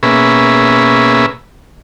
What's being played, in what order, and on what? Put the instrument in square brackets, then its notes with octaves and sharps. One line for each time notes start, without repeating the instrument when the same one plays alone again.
[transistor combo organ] B2 A#3 C#4 G#4 B4 E5